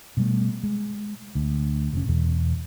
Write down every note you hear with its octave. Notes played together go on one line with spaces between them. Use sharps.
B2 G3 A3
G#3
D2
F1 C#4
E2 B2